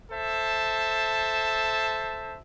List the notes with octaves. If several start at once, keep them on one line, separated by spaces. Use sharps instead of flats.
A4 C5 E5 A5